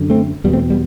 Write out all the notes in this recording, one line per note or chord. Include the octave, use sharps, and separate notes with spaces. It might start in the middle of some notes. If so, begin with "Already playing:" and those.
Already playing: F#2 D3
A3 C4
E2 B2 G3 B3
A3 C4
G3 B3